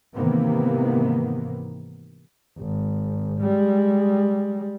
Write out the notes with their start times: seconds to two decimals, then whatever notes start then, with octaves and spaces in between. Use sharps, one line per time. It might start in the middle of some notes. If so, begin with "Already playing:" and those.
0.15 G#2 C3 D#3 E3 A#3 B3
2.58 G#1
3.39 G3 G#3